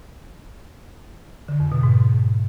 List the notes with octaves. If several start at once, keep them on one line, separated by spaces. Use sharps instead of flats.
D3
F2
B2
G#2